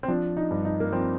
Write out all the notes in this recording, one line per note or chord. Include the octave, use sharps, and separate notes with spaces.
C4
F3 D4
D#4
G2
D#4
A#3
F3 C4